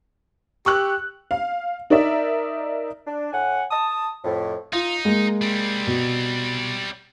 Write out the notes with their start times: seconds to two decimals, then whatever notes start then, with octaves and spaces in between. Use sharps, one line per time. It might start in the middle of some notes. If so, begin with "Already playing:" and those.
0.66 G4 C#6 E6 F#6
1.31 F5
1.90 D#4 A#4 D5 E5
3.07 D4
3.33 A2 F#5 G#5
3.71 A5 D#6
4.25 F2 A2
4.73 D#4 F4
5.05 G#3 A#3
5.42 G3 C4
5.87 B2